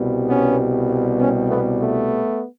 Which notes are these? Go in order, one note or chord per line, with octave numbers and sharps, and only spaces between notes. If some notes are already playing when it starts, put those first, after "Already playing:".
Already playing: C2 B2 G3
B3 C#4
B3 C#4
A3 B3
A3 B3